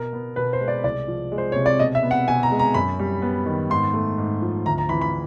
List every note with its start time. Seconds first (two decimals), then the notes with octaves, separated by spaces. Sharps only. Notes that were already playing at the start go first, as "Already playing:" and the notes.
Already playing: B2 A#4
0.13 B3
0.36 B2 B4
0.53 C5
0.61 G#3
0.68 D5
0.84 C2 D5
1.08 F3
1.32 G#3
1.38 C5
1.52 C3 C#5
1.66 D5
1.79 B2 D#5
1.95 E5
2.03 B3
2.11 F#5
2.27 B2 G#5
2.43 A#5
2.51 G#3
2.59 A#5
2.74 F#2 B5
2.99 G3
3.22 B3
3.46 D#3
3.70 G#2 C6
3.93 A3
4.18 G#2
4.42 F3
4.66 D2 A#5
4.78 A#5
4.89 E3 B5
5.01 B5